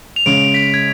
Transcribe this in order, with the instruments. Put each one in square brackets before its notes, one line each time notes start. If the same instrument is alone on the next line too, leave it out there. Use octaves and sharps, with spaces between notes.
[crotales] F7
[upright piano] C#3 G#3 C#4 [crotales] D7
[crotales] B6
G#6